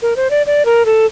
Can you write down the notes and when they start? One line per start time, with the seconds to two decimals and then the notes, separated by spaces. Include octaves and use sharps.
0.02 A#4
0.16 C5
0.30 D5
0.46 D5
0.65 A#4
0.85 A4